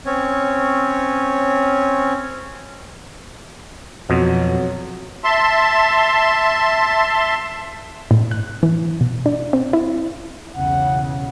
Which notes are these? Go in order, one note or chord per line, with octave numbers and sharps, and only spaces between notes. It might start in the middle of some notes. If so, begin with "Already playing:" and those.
C4 C#4 C#5
F2 B2 F#3
E5 A5 C6
A2
F#6
E3
B2
D4
C4
E4
B1 E2 C#3 F#5